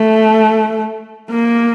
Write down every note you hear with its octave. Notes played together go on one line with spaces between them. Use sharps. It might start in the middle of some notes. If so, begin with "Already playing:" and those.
Already playing: A3
A#3